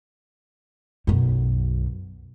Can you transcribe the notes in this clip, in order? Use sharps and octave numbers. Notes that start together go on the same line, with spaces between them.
B1 F#2